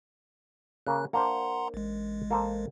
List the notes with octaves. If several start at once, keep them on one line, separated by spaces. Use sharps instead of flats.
C#3 A#3 F#6
A#3 D4 C5 F#5 A#5 C6
A1 G#3
A#3 A4 C5